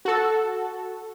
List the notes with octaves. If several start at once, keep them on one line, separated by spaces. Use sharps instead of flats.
F#4 A4